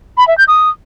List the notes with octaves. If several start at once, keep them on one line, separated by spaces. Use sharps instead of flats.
B5
E5
G6
D#6